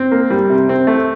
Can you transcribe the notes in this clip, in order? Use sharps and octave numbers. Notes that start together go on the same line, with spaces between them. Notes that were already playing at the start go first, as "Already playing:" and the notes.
Already playing: C4
A#3
G3
C3
C4
A3